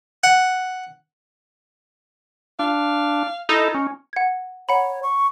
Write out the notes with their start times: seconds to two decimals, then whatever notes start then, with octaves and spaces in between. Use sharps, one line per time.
0.24 F#5
2.59 D4 F5
3.49 D#4 E4 A4
3.74 C#4
4.13 F#5 G#6
4.69 C#5 F#5 A#5 B5
5.03 C#6